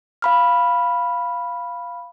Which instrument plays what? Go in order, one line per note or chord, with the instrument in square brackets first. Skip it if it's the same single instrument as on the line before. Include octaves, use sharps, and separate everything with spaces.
[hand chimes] F5 B5 F6